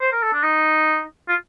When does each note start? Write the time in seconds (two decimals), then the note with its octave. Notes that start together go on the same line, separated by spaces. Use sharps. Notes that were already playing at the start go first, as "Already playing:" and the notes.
0.01 C5
0.12 A#4
0.23 A4
0.33 D4
0.43 D#4
1.28 F4